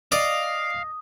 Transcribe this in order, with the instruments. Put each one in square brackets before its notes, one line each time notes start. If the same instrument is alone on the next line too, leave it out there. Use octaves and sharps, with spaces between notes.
[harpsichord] D5 [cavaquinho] D#5 [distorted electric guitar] F5 [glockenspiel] D#6